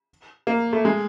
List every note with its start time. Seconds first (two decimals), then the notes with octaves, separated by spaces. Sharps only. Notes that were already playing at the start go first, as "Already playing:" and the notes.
0.47 A#3
0.73 A3
0.85 G#3